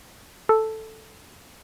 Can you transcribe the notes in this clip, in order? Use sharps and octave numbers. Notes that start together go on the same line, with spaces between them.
A4